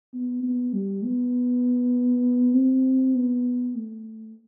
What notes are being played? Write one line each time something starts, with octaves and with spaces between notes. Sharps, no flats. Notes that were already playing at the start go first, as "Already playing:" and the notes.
B3
B3
G3
B3
C4
B3
A3